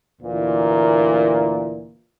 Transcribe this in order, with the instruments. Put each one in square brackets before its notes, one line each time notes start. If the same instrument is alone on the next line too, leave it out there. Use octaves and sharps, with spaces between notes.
[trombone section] D2 A#2 E3 A#3